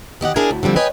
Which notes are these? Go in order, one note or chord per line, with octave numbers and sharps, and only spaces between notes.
D#3 G4 D#5 F#5
D4 E4 G#4 A#4 G#5
D2
D3 F3 G3 C4
B4 C#5 D#5 G5 G#5